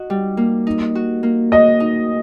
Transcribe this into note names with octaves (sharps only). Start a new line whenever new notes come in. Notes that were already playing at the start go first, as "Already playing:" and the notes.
Already playing: D#4 F#4
G3
A#3
D#4
F#4
A#3
F#4 D#5
D#4